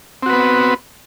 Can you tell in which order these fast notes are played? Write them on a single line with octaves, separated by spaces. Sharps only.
C4 F#4 B4 B3